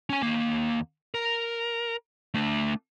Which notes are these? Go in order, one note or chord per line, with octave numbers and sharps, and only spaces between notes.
C#4 G#5
D#2 A#3
A#4
A3 D4